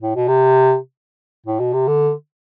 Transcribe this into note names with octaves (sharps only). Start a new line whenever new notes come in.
A2
B2
C3
A2
B2
C3
D3